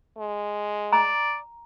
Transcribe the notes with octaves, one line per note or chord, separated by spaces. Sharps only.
G#3
D5 A#5